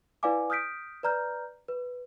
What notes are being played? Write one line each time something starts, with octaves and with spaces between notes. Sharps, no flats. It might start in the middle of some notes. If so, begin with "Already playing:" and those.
E4 B4 D5 F5 G#5 D6
D#6 F6 G6 B6 D7
B4 D5 A#5 F6 G6
B4